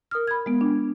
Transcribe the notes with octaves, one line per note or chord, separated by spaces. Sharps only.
A#4 D#6 F6
B5 G#6
G#3 B3
D4